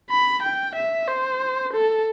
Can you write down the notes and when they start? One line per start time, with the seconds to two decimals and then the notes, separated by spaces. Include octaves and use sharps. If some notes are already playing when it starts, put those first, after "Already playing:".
0.10 B5
0.42 G5
0.76 E5
1.08 C5
1.73 A4